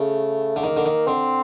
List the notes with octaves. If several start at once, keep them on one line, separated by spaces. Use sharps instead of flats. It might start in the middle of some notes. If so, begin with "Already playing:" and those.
Already playing: C#3 A3
D3
D#3 A#3
D3
D#3
D3 C4